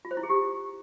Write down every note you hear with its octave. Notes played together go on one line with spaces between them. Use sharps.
F4
C5
E4
G#4
G4